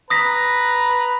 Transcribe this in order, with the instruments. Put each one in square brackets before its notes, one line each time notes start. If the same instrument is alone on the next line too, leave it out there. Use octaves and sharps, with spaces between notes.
[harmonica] B4 A#5 [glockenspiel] D#6 A#6 B6